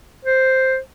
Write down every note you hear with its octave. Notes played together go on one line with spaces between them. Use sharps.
C5